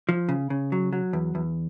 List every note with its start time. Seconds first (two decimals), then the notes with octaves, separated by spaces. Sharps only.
0.09 F3
0.29 C#3
0.50 C#3
0.72 F#3
0.93 F#3
1.13 E2
1.35 E2